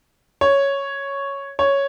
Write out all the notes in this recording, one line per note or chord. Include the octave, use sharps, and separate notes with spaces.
C#5
C#5